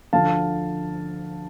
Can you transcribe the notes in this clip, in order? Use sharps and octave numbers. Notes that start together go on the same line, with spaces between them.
D2 D3 F3 F5 A5